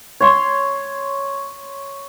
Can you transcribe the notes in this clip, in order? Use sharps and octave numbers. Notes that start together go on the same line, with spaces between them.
C#5 C6